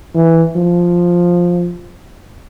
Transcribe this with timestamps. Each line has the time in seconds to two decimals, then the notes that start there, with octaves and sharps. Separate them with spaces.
0.14 E3
0.56 F3